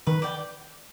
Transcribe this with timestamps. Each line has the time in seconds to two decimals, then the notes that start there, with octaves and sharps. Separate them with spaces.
0.07 D#3 B4
0.22 D5 G5